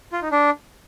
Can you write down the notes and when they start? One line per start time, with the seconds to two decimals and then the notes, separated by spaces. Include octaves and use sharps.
0.12 F4
0.22 D#4
0.32 D4